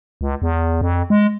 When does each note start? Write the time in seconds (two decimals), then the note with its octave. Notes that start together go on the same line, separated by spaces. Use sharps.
0.21 C#2
0.42 E2
0.81 F2
1.10 G#3